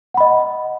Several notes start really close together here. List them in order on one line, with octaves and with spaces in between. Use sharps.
F#5 B5 D#5